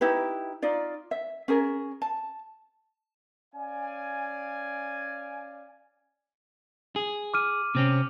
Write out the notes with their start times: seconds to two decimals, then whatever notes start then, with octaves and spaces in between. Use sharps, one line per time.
0.01 D#4 E4 G4 B4
0.62 D#4 F4 D5
1.11 E5
1.48 C#4 G#4 A#4
2.02 A5
3.55 C#4 D5 F5 G#5
6.96 G#4
7.34 D6 F6 D#7
7.75 C3 C4 C#4